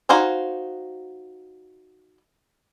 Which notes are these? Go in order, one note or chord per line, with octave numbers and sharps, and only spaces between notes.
D#4 F#4 C5 F5 G#5